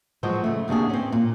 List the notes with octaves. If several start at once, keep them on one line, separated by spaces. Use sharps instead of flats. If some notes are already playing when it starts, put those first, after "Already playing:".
F3 F#3 G#3 F#4 C5
C#3 A3
D#2 C3 D4 F#4 G#4
C4 C#4
A#2